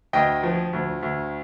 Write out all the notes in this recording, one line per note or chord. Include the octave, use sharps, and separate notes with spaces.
D2 D#5 G5
F3
D2
D2